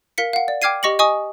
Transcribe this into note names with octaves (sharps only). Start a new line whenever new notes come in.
A#4 F5 B6 C#7
F5 F#5
D5
G5 D6 F6 G#6 C7 D#7
G4 D#5 C#6 A#6 C#7 F#7
D#5 G#5 C#6 D#6